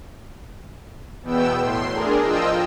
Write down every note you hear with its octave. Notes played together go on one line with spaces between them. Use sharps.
E2 B2 B3 G5 E6
A2 C6
D4 G#4 A#4
F3 F4 D#5 G5 E6